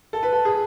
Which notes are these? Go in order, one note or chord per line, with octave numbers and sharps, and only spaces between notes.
A4
B4
A4
G#4